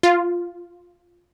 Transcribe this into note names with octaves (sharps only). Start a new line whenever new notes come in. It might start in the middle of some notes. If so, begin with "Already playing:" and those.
F4